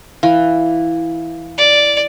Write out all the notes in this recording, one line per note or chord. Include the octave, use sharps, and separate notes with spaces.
E3 F5
D5